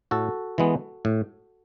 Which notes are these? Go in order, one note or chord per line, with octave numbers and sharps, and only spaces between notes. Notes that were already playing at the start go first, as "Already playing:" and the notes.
A2 F#4 A4
E3 G#3 B3
A2